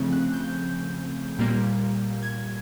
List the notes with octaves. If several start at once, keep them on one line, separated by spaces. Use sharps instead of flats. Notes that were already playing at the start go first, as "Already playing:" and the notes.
Already playing: C#3 F3 A3 C4
F#6
G6
A#2 G3 A#3
G#6